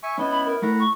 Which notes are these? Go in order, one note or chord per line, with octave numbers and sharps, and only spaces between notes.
E5 G#5 C#6
B3 C#4 E4 D#5
B5
A#4
A3 E4 F#5 A#5 B5
C#6